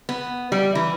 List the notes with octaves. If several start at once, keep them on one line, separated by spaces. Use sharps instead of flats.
B3
G3
E3